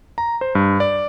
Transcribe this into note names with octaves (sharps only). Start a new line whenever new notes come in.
A#5
C5
G2
D5